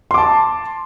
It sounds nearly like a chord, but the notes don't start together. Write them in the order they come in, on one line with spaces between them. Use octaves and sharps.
C6 D6 A5